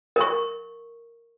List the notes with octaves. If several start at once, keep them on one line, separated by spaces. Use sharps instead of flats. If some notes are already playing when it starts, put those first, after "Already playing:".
A#4 C#6